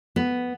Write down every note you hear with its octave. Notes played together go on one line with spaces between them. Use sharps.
B3